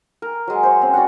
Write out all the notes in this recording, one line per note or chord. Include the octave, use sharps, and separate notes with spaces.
A#4
F#3 G#3
C5 C#5
C4 C#4
F#4 D5 D#5 F#5